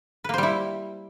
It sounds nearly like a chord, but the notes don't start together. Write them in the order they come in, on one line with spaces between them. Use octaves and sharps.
B4 A#3 C5 G3 E4